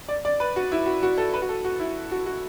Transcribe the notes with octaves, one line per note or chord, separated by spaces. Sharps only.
D5
D5
B4
F#4
E4
F#4
F#4
A4
B4
F#4
A4
F#4
E4
F#4
F#4